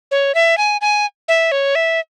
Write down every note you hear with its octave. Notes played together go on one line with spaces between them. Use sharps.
C#5
E5
G#5
G#5
E5
C#5
E5